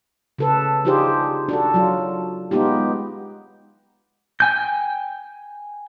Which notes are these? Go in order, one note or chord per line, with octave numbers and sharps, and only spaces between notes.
C#3 A4 B4
D4 D#4 F4 G4 G#4 C5
D4 F#4 A4
F#3 F4
G#3 B3 D#4 F4 G4
G5 G#5 G6